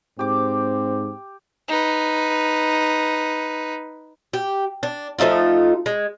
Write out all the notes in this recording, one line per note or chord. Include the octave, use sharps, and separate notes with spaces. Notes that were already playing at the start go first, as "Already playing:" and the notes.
G#2 C4 G4 D6
D#4 B4
G4
D4
F3 A3 D#4 F4
G#3